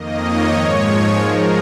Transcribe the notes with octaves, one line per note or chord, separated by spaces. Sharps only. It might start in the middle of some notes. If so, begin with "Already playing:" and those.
Already playing: F2 D#3 A#3 D#5
C#5
G#2 F3 G#3
G#2 F3 G#3 A#4